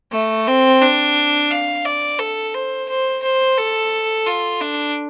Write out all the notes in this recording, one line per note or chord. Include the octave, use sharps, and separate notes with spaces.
A3
C4
D4
F5
D5
A4
C5
C5
C5
A4
F4
D4